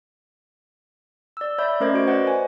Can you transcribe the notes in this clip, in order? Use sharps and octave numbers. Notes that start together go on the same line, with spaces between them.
D5 E6
C#5 D5 E5 B5 G6
A3 C#4 A#4 C5 D#5 G#6
F#4 D7
B4 C5 D5 D#5 F#5
G#5